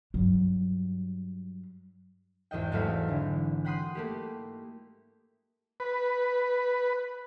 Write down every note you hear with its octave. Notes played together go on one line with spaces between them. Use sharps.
G2 F#3
G#1 E2 D#5 G5
G#1 E2 F#3 A3 F5 B5
D3 E3
F#5 G5 B5 C6 D#6 F#6
A3 A#3 G4
B4